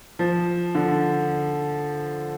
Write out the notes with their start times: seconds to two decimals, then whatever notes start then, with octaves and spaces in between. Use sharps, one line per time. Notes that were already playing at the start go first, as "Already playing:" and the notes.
0.19 F3
0.75 D3